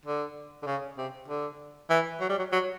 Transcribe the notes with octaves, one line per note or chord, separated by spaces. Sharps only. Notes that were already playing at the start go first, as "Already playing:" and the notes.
D3
D3
C#3
C3
D3
E3
F#3
G3
F#3
F#3